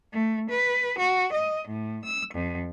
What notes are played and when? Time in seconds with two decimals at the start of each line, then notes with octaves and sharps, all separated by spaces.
0.13 A3
0.50 B4
0.98 F#4
1.33 D#5
1.69 A2
2.05 E6
2.34 F2